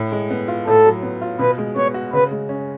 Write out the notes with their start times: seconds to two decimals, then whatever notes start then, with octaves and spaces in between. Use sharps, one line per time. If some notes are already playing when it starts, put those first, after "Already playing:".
Already playing: A2
0.12 G#3
0.30 B3
0.48 F4
0.67 A2 A4
0.86 F#3
1.03 B3
1.22 F4
1.39 B2 B4
1.58 G#3
1.76 B3 C#5
1.94 F#4
2.13 C#3 B4
2.31 G#3
2.49 C#4